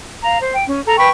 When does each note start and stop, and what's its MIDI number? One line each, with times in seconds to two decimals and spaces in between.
0.23 0.40 77
0.23 0.40 82
0.40 0.53 72
0.54 0.63 79
0.67 0.81 61
0.86 0.96 69
0.86 0.96 82
0.98 1.09 71
0.98 1.09 79
0.98 1.09 83
0.98 1.09 85